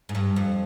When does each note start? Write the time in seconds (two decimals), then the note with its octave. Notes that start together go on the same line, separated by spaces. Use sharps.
0.09 G#2
0.15 G2
0.36 F2